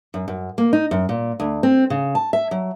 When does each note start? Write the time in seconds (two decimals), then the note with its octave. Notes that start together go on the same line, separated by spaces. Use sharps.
0.14 F#2
0.28 F#2
0.58 A#3
0.73 D#4
0.91 F#2
1.09 A#2
1.40 D2
1.63 C4
1.90 C#3
2.15 A5
2.33 E5
2.51 F#3